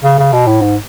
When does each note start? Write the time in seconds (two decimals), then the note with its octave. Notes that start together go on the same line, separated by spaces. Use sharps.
0.04 C#3
0.19 C#3
0.33 B2
0.47 A2
0.61 G#2